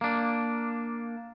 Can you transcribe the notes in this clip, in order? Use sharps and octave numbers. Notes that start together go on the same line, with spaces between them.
A#3 D4